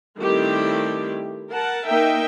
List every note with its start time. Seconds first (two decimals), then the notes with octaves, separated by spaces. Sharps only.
0.19 D#3 G3 A3 C4 E4 G4
1.52 A#4 F#5 A5
1.88 A#3 D#4 A#4 E5 G5